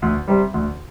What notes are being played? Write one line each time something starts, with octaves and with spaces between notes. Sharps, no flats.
D2
C3 G3
D2